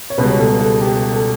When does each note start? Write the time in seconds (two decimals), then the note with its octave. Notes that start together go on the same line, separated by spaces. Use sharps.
0.10 C#5
0.18 C#2 B2 G3 B4
0.39 A4
0.60 A4
0.81 G4
1.13 A4